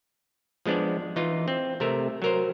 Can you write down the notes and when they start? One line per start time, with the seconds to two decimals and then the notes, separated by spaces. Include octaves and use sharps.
0.66 F3 G#3 B3 D4 D5
1.16 E3 D#4 F4
1.48 C4
1.80 C3 A3 A#4 E5
2.22 F#3 A#4 C5